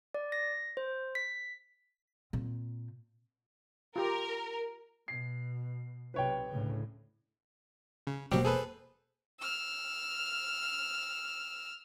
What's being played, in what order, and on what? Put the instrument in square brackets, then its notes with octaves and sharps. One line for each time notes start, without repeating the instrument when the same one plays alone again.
[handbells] D5
A#6
C5
B6
[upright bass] A#2 C4
[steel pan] F4 G4 [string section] A#4
[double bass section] B2 [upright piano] C7
[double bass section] B1 C3 [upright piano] B4 C#5 G5
[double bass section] D2 A2 C#3
[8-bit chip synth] C#3
[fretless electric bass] E1 B2 A#3 [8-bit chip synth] F#3 G3 G4 [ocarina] C5
[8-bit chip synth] G#4 A4 B4
[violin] E6 F6